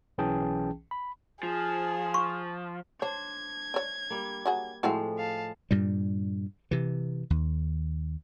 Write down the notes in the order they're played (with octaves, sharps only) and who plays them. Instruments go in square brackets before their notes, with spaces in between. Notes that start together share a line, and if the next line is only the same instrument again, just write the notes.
[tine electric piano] B1 E3 C#4 G#4 G5 A5
B5
[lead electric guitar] F3 [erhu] G#4
[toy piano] C6 C#6
[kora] D4 C5 [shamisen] C#5 [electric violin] G#6
[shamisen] D4 C#5
[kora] G3 A#3
[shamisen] F#3 F#4 G#4
[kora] A2 F3 G#3 [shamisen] C4 E4 F#4
[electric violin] F5 A5
[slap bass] G2 A#2 G3
C3 E3
D#2